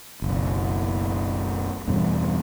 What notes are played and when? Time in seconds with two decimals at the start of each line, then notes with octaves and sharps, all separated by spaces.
0.22 F#1 B1
1.88 E2 G2 B2